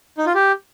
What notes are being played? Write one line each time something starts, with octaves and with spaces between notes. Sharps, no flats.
D#4
F4
G4